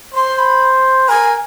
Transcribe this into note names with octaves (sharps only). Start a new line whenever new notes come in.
C5 C6
B5
A#4 G#5